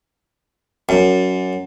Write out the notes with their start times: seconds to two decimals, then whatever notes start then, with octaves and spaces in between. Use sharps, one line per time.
0.89 F#2